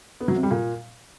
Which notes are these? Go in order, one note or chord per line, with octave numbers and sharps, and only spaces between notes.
B3
F#3
C3
G3
A#2